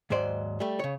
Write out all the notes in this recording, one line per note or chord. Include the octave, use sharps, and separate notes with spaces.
D#2 G#2 F#3 C5 D5
G3 A3
C#3 C#5